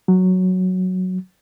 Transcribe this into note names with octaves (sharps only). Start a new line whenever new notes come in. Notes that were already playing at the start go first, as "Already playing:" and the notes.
F#3